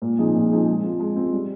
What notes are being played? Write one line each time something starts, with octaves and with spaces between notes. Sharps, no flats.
A#2
F3 C4 D#4 G#4
A#2
F3 C4 D#4 G#4
G#3
C4 F4
G#3
C4 F4
G3